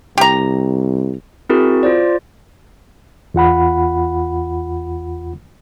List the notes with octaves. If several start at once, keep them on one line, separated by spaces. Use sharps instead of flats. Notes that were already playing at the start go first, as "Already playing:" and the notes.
C2 G4 A#5
C4 E4 F#4 G#4 A#4
F4 C5 D5
E2 F4 F#5 B5